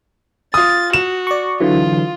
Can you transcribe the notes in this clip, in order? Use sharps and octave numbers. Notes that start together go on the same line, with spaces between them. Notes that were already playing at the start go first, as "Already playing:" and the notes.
F4 D#6 A6
F#4 E7
D5 C#6
D3 E3 F#3 F4